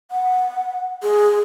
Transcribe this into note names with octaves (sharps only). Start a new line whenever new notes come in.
F#5
G#4